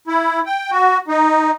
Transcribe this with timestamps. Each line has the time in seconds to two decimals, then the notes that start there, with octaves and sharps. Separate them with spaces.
0.07 E4
0.46 G5
0.71 F#4
1.08 D#4